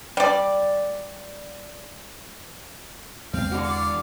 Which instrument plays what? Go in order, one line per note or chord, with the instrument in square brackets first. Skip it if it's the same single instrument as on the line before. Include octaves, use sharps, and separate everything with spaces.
[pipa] G3 D5
[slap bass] E2 G#3 [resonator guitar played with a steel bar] C4 [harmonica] F5
[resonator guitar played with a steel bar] D3 E3 F#4
[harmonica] D5 F5